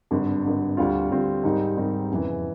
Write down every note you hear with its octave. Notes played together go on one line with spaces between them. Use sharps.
G#1 G2 D3
G#1 G2 D3
D2 D3 G3 C4 F4
D2 D3 G3 C4 F4
G#2 D#3 G3 C4 D#4
G#2 D#3 G3 C4 D#4
F1 E2 C#3 E3